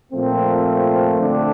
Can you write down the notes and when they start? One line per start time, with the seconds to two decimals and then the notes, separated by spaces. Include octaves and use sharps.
0.12 A#2 F3 A3 C4
1.20 D3 A3 D4